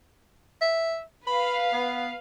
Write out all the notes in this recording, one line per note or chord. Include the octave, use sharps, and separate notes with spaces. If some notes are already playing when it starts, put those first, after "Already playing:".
E5
B4 F5 B5
B3